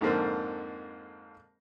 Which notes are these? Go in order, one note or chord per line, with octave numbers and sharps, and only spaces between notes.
F2 G#2 D3 A#3 C4